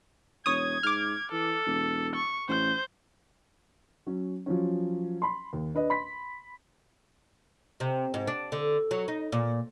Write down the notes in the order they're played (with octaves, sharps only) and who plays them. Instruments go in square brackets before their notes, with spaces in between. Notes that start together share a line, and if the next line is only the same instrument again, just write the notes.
[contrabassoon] E1 [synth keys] C#5 D#6 [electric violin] G#6
[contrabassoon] G#2 [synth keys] D6 F6
[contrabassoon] E3 [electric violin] A4
[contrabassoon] E1
[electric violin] C#6
[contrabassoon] A1 [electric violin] C5 G6
[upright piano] F#3 C#4
F3 F#3 C#4
B5 C6
D#2
D4 B4 D#5
B5 C6 B6
[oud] C3
G#2
D4
D3
F#3
D#4
A#2